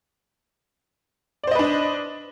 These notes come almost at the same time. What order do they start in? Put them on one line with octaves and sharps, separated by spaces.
D5 C5 D#5 B4 D4